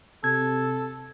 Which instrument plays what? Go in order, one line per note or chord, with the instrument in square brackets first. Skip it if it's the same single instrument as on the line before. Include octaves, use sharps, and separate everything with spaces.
[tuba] C3 [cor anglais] A4 [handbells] G#6